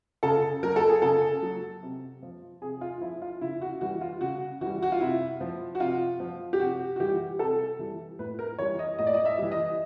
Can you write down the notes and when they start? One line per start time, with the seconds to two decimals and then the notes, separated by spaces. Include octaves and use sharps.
0.23 C#3 A4
0.63 F#3 A#4
0.76 A4
0.89 G#4
1.02 C#3 A4
1.42 F#3
1.83 C3
2.23 F3
2.62 C3 G#4
2.81 F4
3.01 F3 E4
3.22 F4
3.41 C#3 E4
3.61 F#4
3.81 E3 G3 F#4
4.01 F4
4.21 C#3 F#4
4.61 E3 G3 F#4
4.82 F#4
4.92 F4
5.01 C3 E4
5.41 F3
5.75 F#4
5.80 C3 F4
6.20 F3
6.53 G4
6.59 C3 F#4
6.96 F#4
7.00 E3 G3 G4
7.39 C3 A4
7.79 E3 G3
8.19 A2 B4
8.39 A#4
8.58 E3 G3 C#5
8.79 D#5
8.98 A2 D#5
9.07 D5
9.14 D#5
9.25 E5
9.38 E3 G3
9.52 D#5